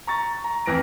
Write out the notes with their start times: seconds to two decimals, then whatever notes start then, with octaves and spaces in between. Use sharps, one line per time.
0.07 A#5 C#6 A6
0.44 A#5
0.66 F2 E3 A#6 D7